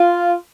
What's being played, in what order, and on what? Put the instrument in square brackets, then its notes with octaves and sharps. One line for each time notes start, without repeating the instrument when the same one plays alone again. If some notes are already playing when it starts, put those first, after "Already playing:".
Already playing: [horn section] F4